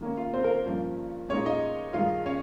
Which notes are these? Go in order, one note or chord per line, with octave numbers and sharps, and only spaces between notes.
D#3 A#3 C#4
F4 F5
C4 C5
A#4
G2 F3 A#3 C#4
A#2 G#3 C#4 D#4 C#5
D#4 D#5
G2 D#3 G#3 D#4 F4 F5
C#4 C#5